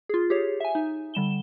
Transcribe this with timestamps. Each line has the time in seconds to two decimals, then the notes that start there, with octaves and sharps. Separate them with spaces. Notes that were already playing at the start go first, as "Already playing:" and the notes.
0.09 F4 G#4
0.30 G4 G#4 C#5
0.60 E5 G#5
0.75 D#4
1.14 D3 G3 E7 G7